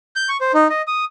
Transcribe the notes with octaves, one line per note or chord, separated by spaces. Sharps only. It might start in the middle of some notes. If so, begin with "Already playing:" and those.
G6
C#6
C5
D#4
D#5
D#6